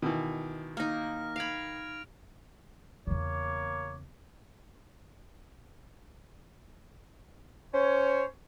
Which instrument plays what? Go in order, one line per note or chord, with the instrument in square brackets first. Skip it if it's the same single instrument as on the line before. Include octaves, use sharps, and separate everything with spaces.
[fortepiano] B2 E3 [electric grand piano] D#3
[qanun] A#3 D#4 [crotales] F6 A#6
[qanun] F5 B5 [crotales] G#6 D7 F7
[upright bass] E2 C#3 [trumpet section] A#3 C#5 D6
[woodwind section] C#4 C5 C#5